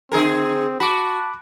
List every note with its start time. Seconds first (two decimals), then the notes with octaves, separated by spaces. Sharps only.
0.12 D3 C4 G#4 A#4
0.80 F#4 A5 B5 D6